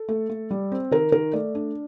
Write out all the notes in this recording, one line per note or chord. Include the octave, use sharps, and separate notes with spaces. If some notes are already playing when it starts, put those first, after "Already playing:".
Already playing: A4
A3
A3
G3
C4
D#3 A#4
D#3 A#4
A3 D5
D4